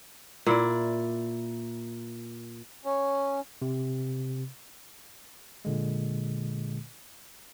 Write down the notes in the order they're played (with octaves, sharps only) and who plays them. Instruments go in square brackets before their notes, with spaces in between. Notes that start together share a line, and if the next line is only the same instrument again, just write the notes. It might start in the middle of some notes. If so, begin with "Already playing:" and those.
[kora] A#2 E4 D5
[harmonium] C#4
[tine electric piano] C3
A#2 D3 G#3